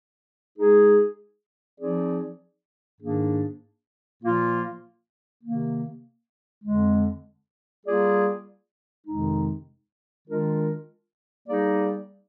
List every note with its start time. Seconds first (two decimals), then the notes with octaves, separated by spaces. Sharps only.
0.57 G#3 D#4 G#4
1.78 F3 C4 D#4 G#4 D5
3.00 G#2 D#3 A#3 D4 G#4
4.22 A#2 F3 A#3 F4
5.43 C3 D#3 A#3
6.63 F2 D3 G#3
7.85 G3 A#3 F4 G#4 D5
9.06 F2 C3 D#3 G#3 D#4
10.27 D#3 G#3 D4 F4 A#4
11.49 G3 A#3 D#4 G#4 D5